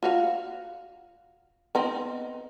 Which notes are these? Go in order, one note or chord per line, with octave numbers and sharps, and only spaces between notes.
F4 F#4 F5
B3 C4 D#4